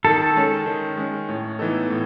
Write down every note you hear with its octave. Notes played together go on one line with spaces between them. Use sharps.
D#3 A4
G#3 C#4
D#3
G#3 C#4
A2
E3 B3 D#4 A4
A2